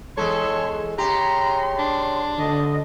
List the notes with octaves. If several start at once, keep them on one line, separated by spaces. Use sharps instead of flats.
E2 G#3 A4 C#5 C6
C#3 G4 A#5 C6
D4 C6
D3 D#5